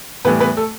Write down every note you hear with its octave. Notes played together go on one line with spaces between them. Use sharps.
A2 E3 G3 B3 B4
B3 B4
A3 A4